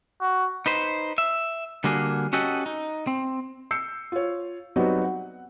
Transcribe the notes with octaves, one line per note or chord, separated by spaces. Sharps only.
F#4
D#4 B4 C5
E5
D3 G3 A#3 F#4 G#4
C#4 F#4 G4 A4 D#5 F#5
D#4
C4
E6 G6 C7 C#7
F4 C#5
F#3 G3 B3 C4 D#4 F#4
F#5